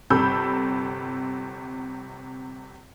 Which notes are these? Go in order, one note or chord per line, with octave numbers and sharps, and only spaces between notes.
G1 C3 A4 B5 E6 G6